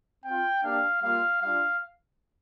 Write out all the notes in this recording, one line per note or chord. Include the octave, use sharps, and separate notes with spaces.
C4 F4 G5
A#3 D4 G4 F5
G3 A#3 F4 F5
G3 D4 F4 F5